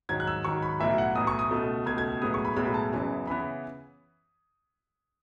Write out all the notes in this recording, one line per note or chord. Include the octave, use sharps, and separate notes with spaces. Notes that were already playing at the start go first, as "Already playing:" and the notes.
G#2 D#3 F#3 G#6
F#6
E6
G#2 D#3 F#3 C#6
B5
B1 A2 E3 E5
F#5
B1 A2 E3 D#6
C#6
D#6
C#2 B2 A3
C#2 B2 A3 G#6
G#6
B1 A2 G#3 B3 D#6
C#6
B5
B1 A2 G#3 B3 B5
A5
F#1 F#2 C#3 E3 B3
C#3 E3 B3 B5